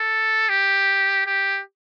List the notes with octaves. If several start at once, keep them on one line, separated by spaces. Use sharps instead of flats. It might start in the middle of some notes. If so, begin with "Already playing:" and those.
Already playing: A4
G4
G4